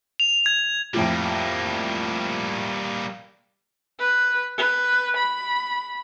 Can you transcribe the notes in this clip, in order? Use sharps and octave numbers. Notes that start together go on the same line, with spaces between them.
F7
G#6
F2 A2 F3 G3 A#3
B4
B4
B5